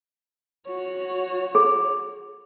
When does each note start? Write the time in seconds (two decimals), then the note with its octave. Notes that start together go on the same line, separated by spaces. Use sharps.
0.67 F#4 C#5
1.55 G#4